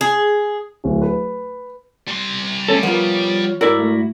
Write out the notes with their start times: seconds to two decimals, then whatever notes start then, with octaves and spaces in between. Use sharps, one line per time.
0.01 G#4
0.84 D1
1.02 B4
2.08 G3 C6
2.68 A3 C#4 A4 C#5
2.83 F3 A#3 B3 F4
3.61 G#2 E4 F#4 A#4 D5 E6
3.79 A3